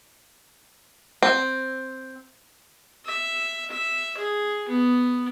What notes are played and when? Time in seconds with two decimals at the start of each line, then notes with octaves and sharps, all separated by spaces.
1.23 C4
3.05 E5
3.71 E5
4.18 G#4
4.69 B3